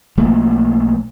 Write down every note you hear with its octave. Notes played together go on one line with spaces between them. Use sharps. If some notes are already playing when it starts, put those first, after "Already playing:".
B1 F3 A3 A#3